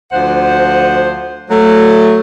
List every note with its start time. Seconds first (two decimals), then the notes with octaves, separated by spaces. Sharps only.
0.12 D2 F3 C5 F#5
1.50 F#3 A3